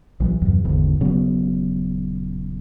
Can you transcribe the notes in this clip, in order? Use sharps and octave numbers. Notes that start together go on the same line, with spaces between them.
A#1 E3 F#3
E2 G2 C3 F#3
G#1 E2 G#2 D3
D#1 C#3 F#3 B3